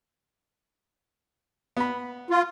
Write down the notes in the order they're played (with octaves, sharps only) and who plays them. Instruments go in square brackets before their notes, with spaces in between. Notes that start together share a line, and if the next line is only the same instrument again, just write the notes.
[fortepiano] B3 B5
[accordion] F4